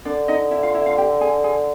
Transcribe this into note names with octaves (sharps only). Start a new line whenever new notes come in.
D3 D4 D5
D#4 D#5
E4 E5
F4 F5
E4 E5
F4 F5
G4 G5
G#4 G#5
G#4 G#5